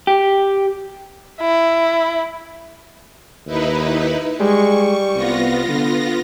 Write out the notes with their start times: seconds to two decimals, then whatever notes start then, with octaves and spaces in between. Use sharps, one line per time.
0.07 G4
1.41 E4
3.46 D#2 D#4 E4 B4
4.40 G3 G#3 C#6
5.15 C2 B3 F4 A#6
5.69 D3